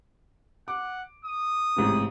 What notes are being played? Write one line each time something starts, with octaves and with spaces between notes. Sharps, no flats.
F#5 D6
D#6
A1 G#2 C3